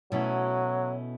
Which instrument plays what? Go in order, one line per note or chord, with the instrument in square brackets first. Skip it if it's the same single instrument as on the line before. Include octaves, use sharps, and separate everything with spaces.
[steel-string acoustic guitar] B2 A3 C#4 E4 [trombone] F#3